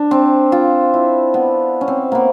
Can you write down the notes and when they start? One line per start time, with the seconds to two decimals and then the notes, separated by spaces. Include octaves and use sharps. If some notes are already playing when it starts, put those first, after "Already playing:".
Already playing: D4
0.11 C4
0.52 F4
0.94 E4
1.34 B3
1.81 C#4
1.88 C4
2.12 A#3 B3